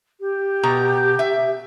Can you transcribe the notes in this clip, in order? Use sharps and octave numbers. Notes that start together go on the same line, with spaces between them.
G4
B2 A#5
E5